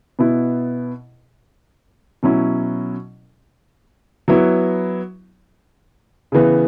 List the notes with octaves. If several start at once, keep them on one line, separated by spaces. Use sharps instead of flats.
B2 B3 E4
B2 F#3 C#4 E4
F#3 B3 E4
C#3 E3 B3